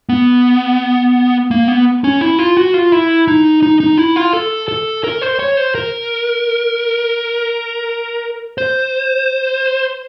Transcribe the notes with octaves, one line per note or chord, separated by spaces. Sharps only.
B3
A#3
B3
C#4
E4
F4
F#4
F4
E4
D#4
D#4
D#4
E4
F4
A4
A4
A#4
C5
C#5
C5
A#4
C5